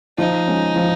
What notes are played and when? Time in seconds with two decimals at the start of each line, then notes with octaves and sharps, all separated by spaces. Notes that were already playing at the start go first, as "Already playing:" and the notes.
0.18 F3 D#4
0.48 G#3 C#4
0.76 F3